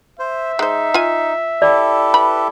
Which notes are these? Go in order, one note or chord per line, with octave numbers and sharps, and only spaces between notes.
C5 E5
G#3 D#4 C5
F4 G#5
E4 G4 A4 D5
B4 B5